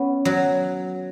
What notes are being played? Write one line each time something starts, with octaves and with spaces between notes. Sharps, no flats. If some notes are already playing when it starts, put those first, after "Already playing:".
Already playing: B3 C#4
F#3